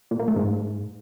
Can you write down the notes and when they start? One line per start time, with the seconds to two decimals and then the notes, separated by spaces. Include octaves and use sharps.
0.11 A#2
0.19 A#3
0.28 A3
0.36 G#2